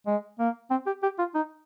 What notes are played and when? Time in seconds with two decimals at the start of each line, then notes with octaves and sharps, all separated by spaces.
0.07 G#3
0.39 A#3
0.71 C4
0.86 G4
1.03 G4
1.19 F4
1.35 D#4